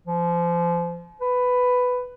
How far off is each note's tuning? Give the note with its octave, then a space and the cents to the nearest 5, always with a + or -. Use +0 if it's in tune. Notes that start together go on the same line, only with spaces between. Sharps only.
F3 -25
B4 +10